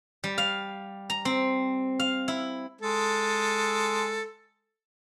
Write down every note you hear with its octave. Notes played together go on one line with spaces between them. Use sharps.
G3
F5
A#5
C4
F5
E4
G#3 A4